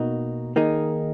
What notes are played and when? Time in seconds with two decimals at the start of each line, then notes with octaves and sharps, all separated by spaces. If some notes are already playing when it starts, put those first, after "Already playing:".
Already playing: B2 A#3 D#4 F#4
0.56 D#3 A#3 D#4 G#4